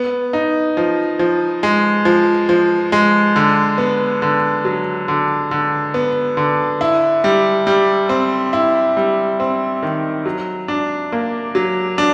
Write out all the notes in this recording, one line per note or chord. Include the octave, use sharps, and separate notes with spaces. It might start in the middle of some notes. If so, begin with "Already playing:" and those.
Already playing: B3
D#4
F3
F3
G#3
F3
F3
G#3
D3
B3
D3
F#3
D3
D3
B3
D3
E4
G3
G3
C4
E4
G3
C4
D#3
F#3
D4
A#3
F#3
D4